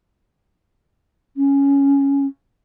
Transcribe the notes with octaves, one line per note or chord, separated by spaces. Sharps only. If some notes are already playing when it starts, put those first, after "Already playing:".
C#4